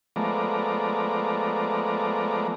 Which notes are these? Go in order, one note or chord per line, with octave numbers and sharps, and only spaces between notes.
F3 G#3 A3 B3 D5 A#5